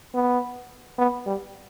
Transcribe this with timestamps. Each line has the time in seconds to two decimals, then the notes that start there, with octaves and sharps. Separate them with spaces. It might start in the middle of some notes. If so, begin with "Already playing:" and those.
0.14 B3
0.99 B3
1.27 G3